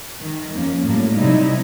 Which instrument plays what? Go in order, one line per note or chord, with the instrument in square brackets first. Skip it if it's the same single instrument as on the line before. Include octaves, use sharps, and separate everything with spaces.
[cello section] D#3
F2 A#3 C#4
A2 F#3 G3 A#3
C3 F#3 G3 D#4 E4